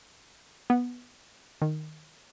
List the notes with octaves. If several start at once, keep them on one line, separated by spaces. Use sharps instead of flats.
B3
D#3